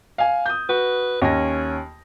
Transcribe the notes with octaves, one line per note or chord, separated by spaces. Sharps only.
F5 G#5
D#6 G6
F#4 B4
D#2 C#4 A#6